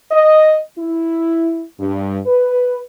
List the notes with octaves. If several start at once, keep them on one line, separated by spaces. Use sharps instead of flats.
D#5
E4
G2
B4